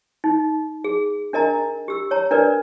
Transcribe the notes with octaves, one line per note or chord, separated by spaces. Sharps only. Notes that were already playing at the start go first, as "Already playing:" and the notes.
D#4
G#4
D4 A#4 D#5 A#5
G4 E6
C#5 A#5
D4 A#4 B4 D5